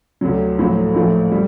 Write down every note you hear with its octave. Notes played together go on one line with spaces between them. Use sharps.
D2 C3 F#3
A#1 A2 F#3 C4
A#1 A2 A3
G3